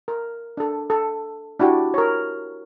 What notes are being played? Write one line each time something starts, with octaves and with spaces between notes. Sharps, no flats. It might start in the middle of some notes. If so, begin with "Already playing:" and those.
A#4
D4 A4
A4
D4 E4 F#4 G4 G5
A#4 C#5